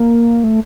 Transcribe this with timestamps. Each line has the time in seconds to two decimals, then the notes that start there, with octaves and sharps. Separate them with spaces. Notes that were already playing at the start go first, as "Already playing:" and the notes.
Already playing: A#3
0.44 A3